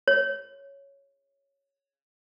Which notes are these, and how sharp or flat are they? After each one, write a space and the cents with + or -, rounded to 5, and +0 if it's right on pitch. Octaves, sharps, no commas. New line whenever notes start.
C#5 +0